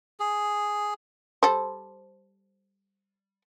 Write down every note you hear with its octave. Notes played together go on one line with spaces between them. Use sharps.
G#4
G3 A4 C5